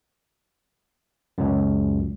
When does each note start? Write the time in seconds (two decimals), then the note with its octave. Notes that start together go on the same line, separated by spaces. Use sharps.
1.38 C#2 F#2